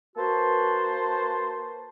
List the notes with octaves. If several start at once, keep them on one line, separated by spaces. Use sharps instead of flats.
A#3 F#4 B4 C5 A5